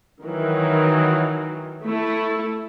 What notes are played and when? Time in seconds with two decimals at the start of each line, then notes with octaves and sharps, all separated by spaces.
0.23 D#3 E3 F#3
1.84 A3 E4 A4